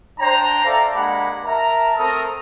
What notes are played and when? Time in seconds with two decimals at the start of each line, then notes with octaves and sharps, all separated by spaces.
0.19 D4 C5 G5 A#5
0.64 A4 D5 E5 F5 A#5
0.95 G#3 A#3 D4 G4 F#5 B5
1.45 A#4 E5 A5 A#5
1.97 A3 C4 A4 A#4 A#5 D#6